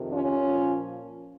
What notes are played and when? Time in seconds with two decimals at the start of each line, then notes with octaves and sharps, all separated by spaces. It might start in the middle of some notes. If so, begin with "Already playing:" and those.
Already playing: F2 C3 D#3
0.11 C#4 F4
0.45 A#2 F3